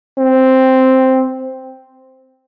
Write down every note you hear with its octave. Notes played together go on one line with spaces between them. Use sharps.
C4